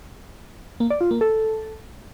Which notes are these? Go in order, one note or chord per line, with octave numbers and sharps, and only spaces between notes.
A#3
D5
F4
A#3
A4